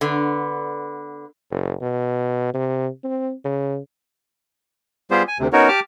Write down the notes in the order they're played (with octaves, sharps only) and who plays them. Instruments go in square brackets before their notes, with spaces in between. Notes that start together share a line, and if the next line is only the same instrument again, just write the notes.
[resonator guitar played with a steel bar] D3 B3
[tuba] F#1
B2
C3
C4
C#3
[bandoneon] G3 B3 F4 G4 G#4 C5
G#5
D2 C3
B3 C#4 D#4 F#4 A#4 C#5
G4 A5 D6 F6